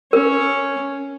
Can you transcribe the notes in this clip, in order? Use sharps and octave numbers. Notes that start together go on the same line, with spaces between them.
C#4 A#4